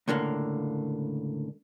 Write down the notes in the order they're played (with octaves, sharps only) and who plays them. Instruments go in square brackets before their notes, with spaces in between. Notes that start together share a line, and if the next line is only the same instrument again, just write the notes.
[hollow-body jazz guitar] C#2 A2 D3 A#3